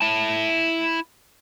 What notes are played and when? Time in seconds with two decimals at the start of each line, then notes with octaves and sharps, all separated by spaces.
0.01 E4 A5